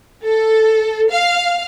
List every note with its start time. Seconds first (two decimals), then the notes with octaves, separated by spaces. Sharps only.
0.23 A4
1.10 F5